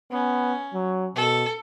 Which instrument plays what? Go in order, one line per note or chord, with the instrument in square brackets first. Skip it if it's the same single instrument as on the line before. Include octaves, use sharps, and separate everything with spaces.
[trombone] B3 [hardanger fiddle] C#4
[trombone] F#3
[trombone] B2 [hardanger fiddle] A4